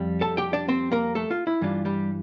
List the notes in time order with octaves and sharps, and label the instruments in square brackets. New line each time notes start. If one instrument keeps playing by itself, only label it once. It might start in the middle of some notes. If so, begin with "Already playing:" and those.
Already playing: [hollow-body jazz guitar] F2 G3
A4 A5
G4 G5
D4 D5
C4 C5
A#3 A#4
A3 A4
F4
E4
G2 E3 G3 D4 F4
G3 G4